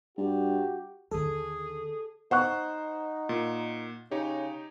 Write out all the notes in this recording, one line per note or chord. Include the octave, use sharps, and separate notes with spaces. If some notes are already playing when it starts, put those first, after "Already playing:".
G2 F#4 G4
D#2 D3 G#4 A4
D#4 C5 F#5 C#6 F#6
A#2
C#3 D#4 G4 C#5